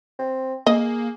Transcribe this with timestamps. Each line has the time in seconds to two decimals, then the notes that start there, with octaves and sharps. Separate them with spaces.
0.19 C4
0.67 A#3 G#4 D#5